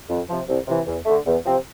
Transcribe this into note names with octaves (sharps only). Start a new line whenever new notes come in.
F2
C3 F3
C2
C3 E3
E2
D3 A3
E2
C3 F3 C4